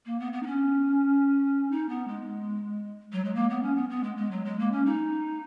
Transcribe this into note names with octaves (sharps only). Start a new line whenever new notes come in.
A#3
B3
B3
D#4
C#4
D#4
B3
G#3
F#3
G#3
A#3
B3
C#4
B3
B3
G#3
G#3
F#3
G#3
A#3
C#4
D#4